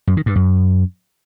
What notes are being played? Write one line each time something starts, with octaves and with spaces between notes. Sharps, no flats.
F#2
D#3
G2
F#2